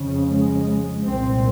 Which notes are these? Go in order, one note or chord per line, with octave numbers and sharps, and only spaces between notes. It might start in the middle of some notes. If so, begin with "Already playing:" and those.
Already playing: F2 C#3
G#3
C2 A#2 C4